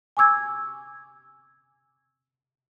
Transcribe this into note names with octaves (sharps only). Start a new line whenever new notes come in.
G#5 C#6 D6 E6 G#6